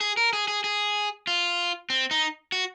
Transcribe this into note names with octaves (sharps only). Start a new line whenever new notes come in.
G#4
A#4
G#4
G#4
G#4
F4
C4
D#4
F#4